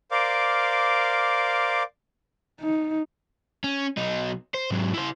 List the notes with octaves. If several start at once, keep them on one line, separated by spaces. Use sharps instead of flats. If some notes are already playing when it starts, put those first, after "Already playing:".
A#4 C5 D5 F5 D6
D#4
C#4
B1 D#4
C5
G#2 F#3
E4 C5